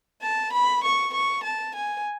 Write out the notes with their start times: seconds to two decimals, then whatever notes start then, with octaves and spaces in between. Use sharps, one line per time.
0.22 A5
0.52 B5
0.83 C#6
1.13 C#6
1.43 A5
1.75 G#5